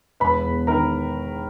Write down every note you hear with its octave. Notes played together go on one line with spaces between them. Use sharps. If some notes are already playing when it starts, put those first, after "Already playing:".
E1 B4 B5
E2
D#3 A#4 A#5